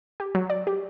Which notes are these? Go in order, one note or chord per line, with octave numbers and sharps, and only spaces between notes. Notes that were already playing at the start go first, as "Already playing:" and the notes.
G4
F#3
D5
G4